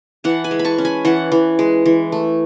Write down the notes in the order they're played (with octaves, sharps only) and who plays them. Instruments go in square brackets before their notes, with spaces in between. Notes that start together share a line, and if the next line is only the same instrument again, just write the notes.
[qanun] E3 F#5 A5
G#5 B5
G#3
B5
A5 C#6
C#4
G#5 B5
E3 F#5 A5
E3
G#3
E3
A3